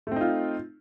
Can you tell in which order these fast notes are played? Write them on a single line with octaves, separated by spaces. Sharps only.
A3 C4 D#4 F4